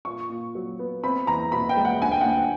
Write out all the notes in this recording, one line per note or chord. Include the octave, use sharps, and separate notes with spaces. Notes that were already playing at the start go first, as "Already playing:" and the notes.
A#2 C#6
A#2
F#3
B3
C4 B5
E2 A#5
B2 B5
G5
G#3
F#5
D2 G#5
G5
D2 F#5
G5